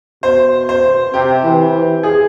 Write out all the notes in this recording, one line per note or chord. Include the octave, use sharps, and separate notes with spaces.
B2 C5
C5
C3 G4
E3
E3
G#4